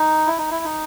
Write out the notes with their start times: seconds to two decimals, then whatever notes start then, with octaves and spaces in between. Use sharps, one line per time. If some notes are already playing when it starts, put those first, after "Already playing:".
Already playing: D#4
0.26 E4
0.38 D#4
0.51 E4
0.64 D#4